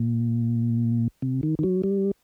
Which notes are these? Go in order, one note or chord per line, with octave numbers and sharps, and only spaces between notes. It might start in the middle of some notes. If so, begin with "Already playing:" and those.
Already playing: A#2
C3
D#3
D#3
F#3
G3